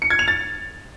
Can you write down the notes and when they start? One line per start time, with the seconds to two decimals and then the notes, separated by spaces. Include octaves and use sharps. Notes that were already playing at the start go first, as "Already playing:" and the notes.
0.02 C#7
0.10 G#6
0.19 F7
0.28 A6